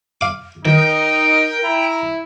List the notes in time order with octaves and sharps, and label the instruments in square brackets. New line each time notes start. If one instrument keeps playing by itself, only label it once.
[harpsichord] F5 D6
[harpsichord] D#3 [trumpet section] D#4 [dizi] A#4 [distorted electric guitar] G5
[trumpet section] E4 [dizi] A#5